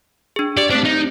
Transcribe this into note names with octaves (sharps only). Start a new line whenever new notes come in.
D4 G#4
G4 D5
A3 C4 D4 C5
D#4